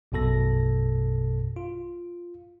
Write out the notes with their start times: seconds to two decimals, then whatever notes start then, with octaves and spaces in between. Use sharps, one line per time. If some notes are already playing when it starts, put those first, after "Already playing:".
0.12 A#1 F#2 B2 A4 A#6
1.56 F4